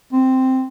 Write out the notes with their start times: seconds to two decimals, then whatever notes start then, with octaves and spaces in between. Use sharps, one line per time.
0.13 C4